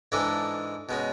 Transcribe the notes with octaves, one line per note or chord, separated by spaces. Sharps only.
G#2 E3 G#3 D4 A4
B2 G#3 C#4